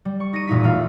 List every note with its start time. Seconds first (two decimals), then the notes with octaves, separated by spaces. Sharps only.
0.05 G3
0.20 C#6
0.33 D#4 A#6 C#7 D#7
0.47 E1 A#2 D#4 B6
0.63 A2 E3 A3 F4 F5